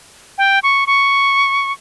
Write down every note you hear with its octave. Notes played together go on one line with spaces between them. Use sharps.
G5
C#6
C#6